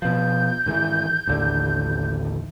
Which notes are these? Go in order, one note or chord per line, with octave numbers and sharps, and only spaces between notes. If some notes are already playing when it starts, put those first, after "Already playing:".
B2 F3 G6
G#2 D#3 E3
A1 D#2 D3